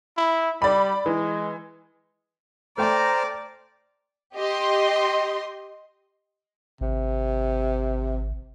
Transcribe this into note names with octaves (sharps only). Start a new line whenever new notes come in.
E4
G3 D5 B5
E3 G#3
A3 C5 D5 G5 A#5 F6
G4 D#5 C6
G#1 C3